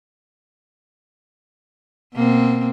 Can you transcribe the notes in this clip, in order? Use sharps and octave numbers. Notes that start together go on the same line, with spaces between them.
B2 A#3 C4